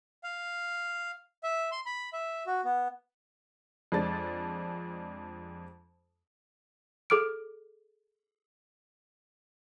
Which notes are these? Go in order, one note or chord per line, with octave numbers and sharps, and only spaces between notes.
F5
E5
C6
B5
E5
F#4
B3
F2 G#3 D4 A6
G#4 A4 D6 F6 D7